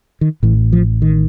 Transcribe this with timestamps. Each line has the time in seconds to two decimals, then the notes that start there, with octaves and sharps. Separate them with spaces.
0.21 D#3
0.43 A1 A2 E3
0.73 F3
1.02 D#3